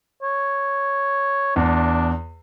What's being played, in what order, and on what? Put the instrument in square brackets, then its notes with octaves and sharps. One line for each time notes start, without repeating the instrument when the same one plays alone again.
[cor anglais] C#5
[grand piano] E2 [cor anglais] D4